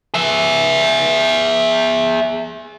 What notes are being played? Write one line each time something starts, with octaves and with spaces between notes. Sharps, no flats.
G#4 E5